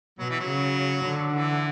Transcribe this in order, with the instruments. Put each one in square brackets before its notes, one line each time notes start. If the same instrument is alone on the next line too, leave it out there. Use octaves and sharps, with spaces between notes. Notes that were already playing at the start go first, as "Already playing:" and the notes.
[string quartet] B2 [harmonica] F#3
[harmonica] E3
F#3
[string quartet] C#3
D3
[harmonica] E3